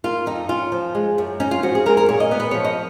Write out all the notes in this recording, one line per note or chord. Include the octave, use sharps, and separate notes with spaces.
A#3 F4
F2 D#4
C#4 F4
F3
G#3
F#2
C#4 D#4
F4
F3 F#4
G#4
G#3 A#4
A#4
A#2 C#5
D#5
B3
B4
F3 C#5
D#5